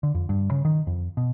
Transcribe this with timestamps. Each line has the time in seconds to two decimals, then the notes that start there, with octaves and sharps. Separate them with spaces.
0.03 D3
0.15 F2
0.29 G2
0.51 C#3
0.65 D#3
0.87 F2
1.17 B2